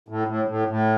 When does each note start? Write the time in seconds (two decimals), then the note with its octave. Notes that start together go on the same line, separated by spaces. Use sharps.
0.08 A2
0.28 A2
0.48 A2
0.68 A2